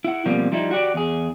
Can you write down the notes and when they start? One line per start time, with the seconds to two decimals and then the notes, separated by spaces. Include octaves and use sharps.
0.04 E4 F#5
0.25 B2 F3 G3 A#3 C4
0.52 F3 G3 D#4 E4
0.71 F#4 G4 D5
0.94 E2 G#4